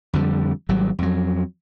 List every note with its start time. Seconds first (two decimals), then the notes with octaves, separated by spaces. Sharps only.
0.13 F2 D3 F3 G3
0.69 G#1 F#3 G3
0.99 F2 F#3